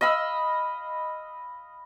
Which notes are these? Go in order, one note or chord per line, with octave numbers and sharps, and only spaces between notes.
D#5 F5 B5 E6